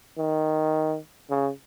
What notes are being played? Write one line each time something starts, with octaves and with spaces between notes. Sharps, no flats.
D#3
C#3